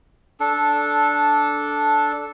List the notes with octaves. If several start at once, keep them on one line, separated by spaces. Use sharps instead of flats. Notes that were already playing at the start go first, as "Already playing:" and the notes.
D4 A4